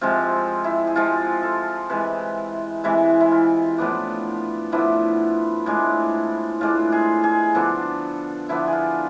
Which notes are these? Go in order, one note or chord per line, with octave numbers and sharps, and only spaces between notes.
C3 F3 G#3 C4 F4
E4
G#4
C3 F3 G#3 C4 F4
A4
C3 E3 G#3 B4
C3 E3 G#3 E4
E4
F4
A2 F3 B3 D4
A2 F3 B3 D4 E4
A2 G#3 D4
A2 G#3 D4 F4
G#4
G#4
D3 F3 B3 D4 A4
D3 F3 B3 D4 E4
G#4
F4